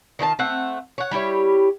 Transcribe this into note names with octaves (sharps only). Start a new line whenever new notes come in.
D#3 F4 G4 A5
A3 C4 F#5
C#5 F#5
G3 E4 G4 C#5